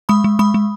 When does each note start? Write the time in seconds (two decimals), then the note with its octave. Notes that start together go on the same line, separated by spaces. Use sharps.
0.09 G#3 B5 D#6
0.24 G#3
0.39 G#3 B5 D#6
0.54 G#3